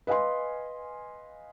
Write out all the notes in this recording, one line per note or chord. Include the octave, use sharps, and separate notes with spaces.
B4 D#5 F5 G#5 C6